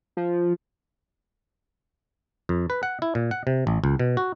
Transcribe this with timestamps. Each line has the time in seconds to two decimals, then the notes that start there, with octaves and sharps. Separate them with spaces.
0.17 F3
2.49 F2
2.70 B4
2.83 F#5
3.02 E4
3.15 A#2
3.31 F#5
3.47 C3
3.67 A1
3.84 C#2
3.99 B2
4.17 F#4